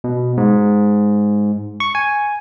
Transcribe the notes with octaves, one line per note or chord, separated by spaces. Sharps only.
B2
G#2
C#6
G#5